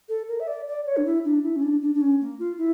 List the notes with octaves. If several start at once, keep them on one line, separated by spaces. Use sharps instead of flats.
A4
A#4
E5
D5
D5
C#5
D4
E4
D4
E4
C#4
D4
D4
D4
C#4
A#3
F4
E4